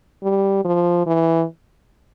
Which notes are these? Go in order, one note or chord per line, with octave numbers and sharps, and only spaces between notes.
G3
F3
E3